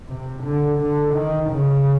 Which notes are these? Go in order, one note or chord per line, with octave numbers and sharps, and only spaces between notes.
C3
D3
D3
D#3
C#3